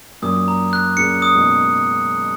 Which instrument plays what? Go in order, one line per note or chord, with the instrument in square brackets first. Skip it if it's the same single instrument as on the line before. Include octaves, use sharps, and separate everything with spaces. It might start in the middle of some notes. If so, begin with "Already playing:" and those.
[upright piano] F#2 A#2 [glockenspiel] D#6
[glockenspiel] A#5
F#6
[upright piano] A#2 C#3 [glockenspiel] C#7
[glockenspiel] D#6
[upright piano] G#2 B2